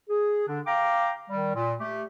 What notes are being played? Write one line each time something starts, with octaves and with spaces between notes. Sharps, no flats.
G#4
D3 D4
F5 G5 A#5 D6
D#3 G3
A#2
A3 G4